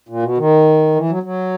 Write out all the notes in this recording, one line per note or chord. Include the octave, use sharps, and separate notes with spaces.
A#2
B2
D#3
E3
F#3
F#3